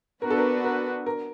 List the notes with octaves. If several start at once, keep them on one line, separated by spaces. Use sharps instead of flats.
B3 D4 F#4 A#4 B4
A4
A#4
A#4
A#4